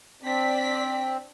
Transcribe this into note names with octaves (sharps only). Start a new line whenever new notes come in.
C4 D4 D5 B6